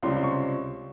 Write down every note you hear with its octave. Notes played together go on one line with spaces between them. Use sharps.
C#2 C3 G3 C#4 C6
C6
C#6